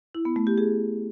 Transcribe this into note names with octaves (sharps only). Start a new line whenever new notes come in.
E4
B3
A3
G4
G#4